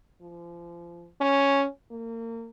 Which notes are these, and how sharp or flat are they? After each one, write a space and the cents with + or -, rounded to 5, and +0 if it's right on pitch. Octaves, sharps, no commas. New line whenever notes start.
F3 -30
C#4 +0
A#3 -30